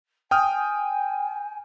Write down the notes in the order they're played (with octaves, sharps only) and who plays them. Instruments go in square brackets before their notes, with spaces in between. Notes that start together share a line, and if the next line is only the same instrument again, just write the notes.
[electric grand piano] G5 D#6 F6 [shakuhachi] G#5